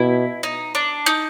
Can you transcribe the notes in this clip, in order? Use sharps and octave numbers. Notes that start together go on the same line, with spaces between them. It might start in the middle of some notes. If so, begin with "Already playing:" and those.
Already playing: B2 E4
D#4
D4
D#4